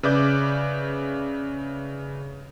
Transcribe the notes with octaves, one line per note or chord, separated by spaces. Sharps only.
C#3 B4 D5 E5 D6 G6